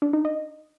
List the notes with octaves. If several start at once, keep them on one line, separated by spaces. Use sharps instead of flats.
D4
D#4
D#5